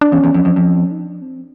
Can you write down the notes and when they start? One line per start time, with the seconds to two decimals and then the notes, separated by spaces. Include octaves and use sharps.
0.01 D4
0.12 E2 C#4
0.24 E2
0.34 F2
0.45 F2
0.56 F2
0.92 D#4
1.00 D4
1.22 C4